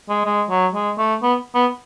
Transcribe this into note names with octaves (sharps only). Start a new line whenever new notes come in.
G#3
G#3
F#3
G#3
A3
B3
B3